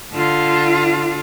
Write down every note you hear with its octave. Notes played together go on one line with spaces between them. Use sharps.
D3 F4